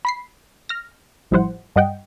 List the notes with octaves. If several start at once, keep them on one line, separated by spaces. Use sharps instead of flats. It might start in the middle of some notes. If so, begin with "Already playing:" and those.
B5 B6 C7
F6 A#6
A1 F3 G3 E4 C5 F#5
G2 G3 D#5 F#5 G5